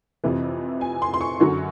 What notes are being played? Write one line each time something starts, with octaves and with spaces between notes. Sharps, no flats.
F2 C3 E3
G#5
C6
C6
C#6
F#2 D3 F#3